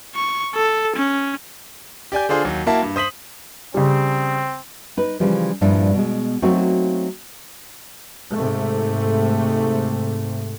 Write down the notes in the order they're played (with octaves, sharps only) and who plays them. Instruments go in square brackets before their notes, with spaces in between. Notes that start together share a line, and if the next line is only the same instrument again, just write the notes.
[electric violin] C#6
A4
C#4
[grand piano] G4 D5 G#5 G6
D3 D4 F4 G#4 C5
D#2 F#3
A#3 E4 F#4 E5 A5
G2
C5 D#6 B6 F#7
[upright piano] C#3 G3 [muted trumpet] C4
[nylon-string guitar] D#4 B4
C#3 E3 F3 G3
G2 A#2 F3 D4 E4
B2 G#3
F#3 A3 A#3 C4 D#4 F#4
[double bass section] G#2 C3 A3